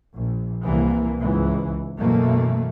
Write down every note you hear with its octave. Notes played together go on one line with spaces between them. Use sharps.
A#1
C2 E3 A#3
C#2 G#2 E3
F#2 B2 E3 A3 A#3